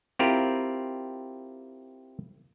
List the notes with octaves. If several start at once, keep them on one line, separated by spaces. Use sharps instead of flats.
C4 E4 F4 G4 A#4